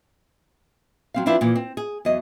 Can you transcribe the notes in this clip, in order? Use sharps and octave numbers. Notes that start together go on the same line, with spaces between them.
F#3 C4 F5
F3 C4 D4 E4 B4 F5
A#2 E3 F3
C4
G#4
E2 F#3 D#5